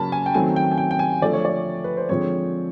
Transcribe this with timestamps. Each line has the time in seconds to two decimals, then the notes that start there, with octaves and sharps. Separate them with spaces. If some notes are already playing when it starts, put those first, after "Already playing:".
Already playing: C#3 F#3 A#3 C#4 A5 B5
0.12 G#5
0.26 G5
0.34 D#3 F#3 A3 C4 G#5
0.56 G5
0.71 G#5
0.78 G5
0.91 G5
0.99 G#5
1.22 D3 F3 A3 D5
1.33 C#5
1.45 D5
1.84 B4
1.97 C5
2.09 D3 F3 G#3 C4 C#5